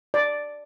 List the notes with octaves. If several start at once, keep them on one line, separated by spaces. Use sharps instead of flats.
D5